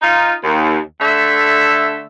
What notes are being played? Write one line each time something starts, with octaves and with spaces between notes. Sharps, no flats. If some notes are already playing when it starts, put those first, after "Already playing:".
D#4 F4
D#2
D3 A3 E5